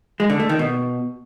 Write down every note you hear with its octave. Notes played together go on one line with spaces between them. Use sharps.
G#3
D3
A3
D#3
B2